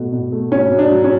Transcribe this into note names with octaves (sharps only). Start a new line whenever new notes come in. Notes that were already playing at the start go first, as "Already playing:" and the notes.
Already playing: B2 A3
B2
A3
F#3 C#4
F#3
D4
F#3
C#4